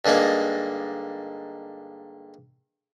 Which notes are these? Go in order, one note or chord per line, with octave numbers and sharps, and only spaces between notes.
G2 D3 G#3 A#3 D#4